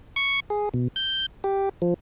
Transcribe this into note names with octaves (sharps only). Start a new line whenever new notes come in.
C#6
G#4
B2
G6
G4
F3